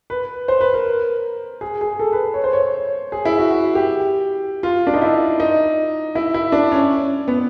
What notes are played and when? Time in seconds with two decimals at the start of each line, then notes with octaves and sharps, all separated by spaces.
0.10 B4
0.48 C5
0.61 B4
0.74 A#4
1.61 G#4
1.81 G#4
1.99 A4
2.13 B4
2.34 C#5
2.44 C5
2.53 C#5
3.12 G#4
3.25 E4
3.38 F#4
3.51 F#4
3.75 G4
4.63 F4
4.87 D4
4.94 D#4
5.02 E4
5.40 D#4
6.15 E4
6.34 E4
6.52 D4
6.72 C#4
7.28 B3